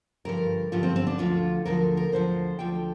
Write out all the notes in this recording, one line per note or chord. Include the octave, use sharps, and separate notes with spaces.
G2 D3 F3 A#4
G2 D3 F3 F4
C4
C4
D4
D2 D3 F3 F4
D2 D3 F3 A#4
A#4
D2 D3 F3 C5
D2 D3 F3 G5